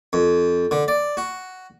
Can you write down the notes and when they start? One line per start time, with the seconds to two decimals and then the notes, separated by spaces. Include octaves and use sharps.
0.13 F2
0.71 D3
0.88 D5
1.17 F#4